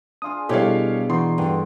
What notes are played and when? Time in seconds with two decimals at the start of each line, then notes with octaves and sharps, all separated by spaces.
0.22 D4 F4 G#4 D#6
0.49 B2 G3 E4 G4 A4 C#5 F5
1.10 E3 D#4 F#4 D5 C6
1.38 G2 D3 D6